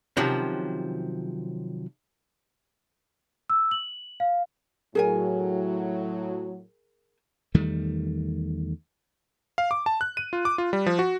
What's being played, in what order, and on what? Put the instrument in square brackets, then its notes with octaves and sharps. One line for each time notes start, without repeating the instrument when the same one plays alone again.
[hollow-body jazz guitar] C3 D#3 F3 F#3 C#4
[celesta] E6
F#7
F5
[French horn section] A2 F#3 [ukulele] G#4 A#4 G#5
[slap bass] E2 D#3 G3 A3
[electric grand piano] F5
D6
A5
F#6
D#7
F4
D6
F4
G3
F3
F#4